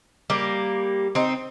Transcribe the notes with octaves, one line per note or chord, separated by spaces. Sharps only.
G3 A#3
C4 D#4